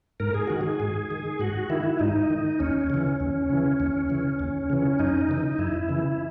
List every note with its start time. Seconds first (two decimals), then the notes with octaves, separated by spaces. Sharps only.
0.20 G#2 A#4
0.34 G#4
0.47 D#3 F#4
0.61 G#4
0.80 G#2
1.11 D#3
1.39 G#2 F#4
1.70 D#3 E4
1.99 G#2 D#4
2.30 D#3
2.59 D#2 C#4
2.90 C#3 E3
3.20 D#2
3.50 C#3 E3
3.80 D#2
4.09 C#3 E3
4.39 D#2
4.70 C#3 E3
4.99 F#2 D#4
5.29 C#3 E3
5.59 F#2 E4
5.89 C#3 E3